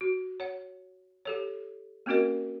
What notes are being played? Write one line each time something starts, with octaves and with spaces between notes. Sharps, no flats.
F#4
C#5 F#5
G4 A4 C#5
A#3 C4 C#4 F#4 A#4 D#5